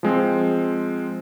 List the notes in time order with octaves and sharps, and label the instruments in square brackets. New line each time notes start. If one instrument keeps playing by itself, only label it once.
[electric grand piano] F3 G#3 C4